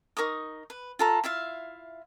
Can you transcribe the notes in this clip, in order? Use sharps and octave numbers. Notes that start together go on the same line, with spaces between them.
D#4 A#4 C#6 D#6
B4
F4 A4 A#5
E4 F4 E5 F5